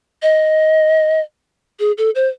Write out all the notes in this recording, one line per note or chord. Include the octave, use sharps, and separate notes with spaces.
D#5
G#4
A4
C5